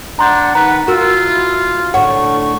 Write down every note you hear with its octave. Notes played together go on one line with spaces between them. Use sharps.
D4 F#5 A#5 C6 G6
D#3 B4 A#5
F4 F#4 A#4 E6
E4
D2 A2 C#5 F#5 C#6